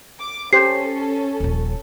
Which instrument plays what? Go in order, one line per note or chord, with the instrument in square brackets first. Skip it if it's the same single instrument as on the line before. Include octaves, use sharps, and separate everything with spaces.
[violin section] D6
[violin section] C#4 A4 [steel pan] G4 C5 [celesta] C7
[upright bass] D#1 A#1